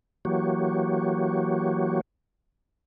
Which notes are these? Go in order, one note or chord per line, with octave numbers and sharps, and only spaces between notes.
E3 F#3 A#3 F#4 G4 C#5